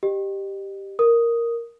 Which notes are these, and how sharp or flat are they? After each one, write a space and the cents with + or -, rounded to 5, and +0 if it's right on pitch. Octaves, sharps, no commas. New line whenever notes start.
G4 +0 D#5 -35
A#4 +0 D#6 +0